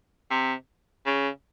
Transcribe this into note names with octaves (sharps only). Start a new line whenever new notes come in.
C3
C#3